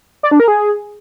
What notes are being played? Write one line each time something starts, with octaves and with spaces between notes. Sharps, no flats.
D5
D4
A#4
G#4